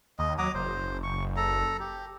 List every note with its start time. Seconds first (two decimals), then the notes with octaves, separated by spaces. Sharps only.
0.19 D#2 D#5
0.38 F#3 A#5 D6 D#6
0.54 F#1 C5
1.03 C#6
1.37 A4 A#5
1.80 G4